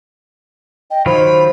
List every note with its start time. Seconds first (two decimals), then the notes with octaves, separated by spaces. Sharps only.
0.91 D#5 G5
1.06 D#3 F#3 F4 C5 B5